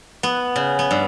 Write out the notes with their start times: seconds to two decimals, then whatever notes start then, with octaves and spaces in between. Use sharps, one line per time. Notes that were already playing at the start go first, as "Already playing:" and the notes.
0.23 B3
0.56 C#3
0.79 B3
0.91 G2